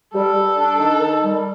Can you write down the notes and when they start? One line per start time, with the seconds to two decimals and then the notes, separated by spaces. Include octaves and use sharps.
0.14 G3 A4
0.36 G3
0.57 D4
0.79 D#3
1.01 D#3
1.22 G3